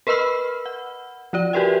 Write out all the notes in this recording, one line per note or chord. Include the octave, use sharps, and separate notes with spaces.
A#4 B4 D#5 B5 E6 F6
F#5
F3 F4 D5
F#4 G4 A#4 B4 E5 G5